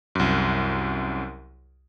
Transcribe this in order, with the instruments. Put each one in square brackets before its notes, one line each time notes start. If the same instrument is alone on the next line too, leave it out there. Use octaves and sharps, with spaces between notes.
[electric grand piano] C2 F#2